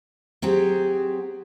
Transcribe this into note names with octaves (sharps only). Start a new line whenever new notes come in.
F#3 C4 G4 G#4